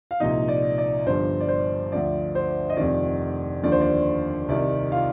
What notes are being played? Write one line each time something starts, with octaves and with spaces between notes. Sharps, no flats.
F5
C2 A#2 F3 D#4 D#5
D5
D5
G1 G2 F3 C5
D5
C5
D2 D3 F3 D5
C5
D#5
F1 F2 D#3 D5
D#2 D3 F3 D5
C5
D5
C2 C3 D#3 D5
F4 F5